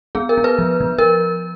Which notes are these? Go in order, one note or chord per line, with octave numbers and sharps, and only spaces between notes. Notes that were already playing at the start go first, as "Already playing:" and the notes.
B3 G#4
A#4
B3
B4
F3
F3
A#4